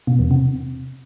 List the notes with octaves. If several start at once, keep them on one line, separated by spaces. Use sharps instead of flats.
B2
E2
C3